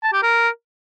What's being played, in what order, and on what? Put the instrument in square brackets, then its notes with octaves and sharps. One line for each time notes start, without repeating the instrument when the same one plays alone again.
[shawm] A5
G4
A#4